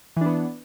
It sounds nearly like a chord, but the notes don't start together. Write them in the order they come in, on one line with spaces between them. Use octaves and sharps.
E3 D4 B3